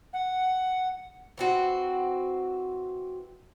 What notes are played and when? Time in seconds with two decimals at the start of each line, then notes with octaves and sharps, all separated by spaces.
0.13 F#5
1.38 E3 C4 F#4